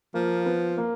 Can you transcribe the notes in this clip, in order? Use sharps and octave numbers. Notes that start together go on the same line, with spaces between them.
F3 A#3
B3
A#3